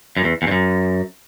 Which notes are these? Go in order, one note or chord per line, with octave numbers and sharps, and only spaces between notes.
F#2
E2
E2
G2
F#2